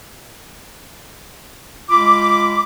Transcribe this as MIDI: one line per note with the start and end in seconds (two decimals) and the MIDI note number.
1.89 2.63 56
1.89 2.63 65
1.89 2.63 83
1.89 2.63 86